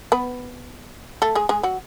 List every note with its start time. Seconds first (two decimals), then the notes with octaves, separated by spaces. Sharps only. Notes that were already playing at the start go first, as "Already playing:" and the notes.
0.12 B3 B4
1.22 A3 A4
1.35 G#3 G#4
1.49 G#3 G#4
1.63 F#3 F#4